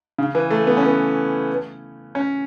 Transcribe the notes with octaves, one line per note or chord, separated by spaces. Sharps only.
C#3
E3
A3
B3
C#4
B3
C#4